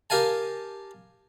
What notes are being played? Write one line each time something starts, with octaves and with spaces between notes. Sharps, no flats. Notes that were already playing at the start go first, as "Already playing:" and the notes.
G4 A#4 F5 G#5 A5